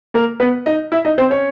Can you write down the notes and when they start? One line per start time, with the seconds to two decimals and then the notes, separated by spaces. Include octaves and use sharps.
0.14 A#3 A#4
0.40 B3 B4
0.66 D#4 D#5
0.92 E4 E5
1.05 D#4 D#5
1.18 C4 C5
1.30 C#4 C#5